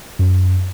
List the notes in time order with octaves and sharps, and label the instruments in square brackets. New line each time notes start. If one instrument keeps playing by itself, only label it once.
[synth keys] F#2